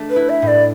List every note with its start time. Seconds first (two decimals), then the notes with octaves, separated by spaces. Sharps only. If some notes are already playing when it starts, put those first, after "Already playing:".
Already playing: A3 D4
0.10 B4
0.16 E4
0.29 E5
0.42 A2
0.47 D5